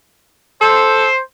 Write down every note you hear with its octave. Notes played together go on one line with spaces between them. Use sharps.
A4 C5